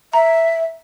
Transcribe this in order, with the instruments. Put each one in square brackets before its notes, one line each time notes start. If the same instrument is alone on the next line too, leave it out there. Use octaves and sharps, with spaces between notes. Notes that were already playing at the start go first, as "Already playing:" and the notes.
[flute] E5 [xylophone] A#5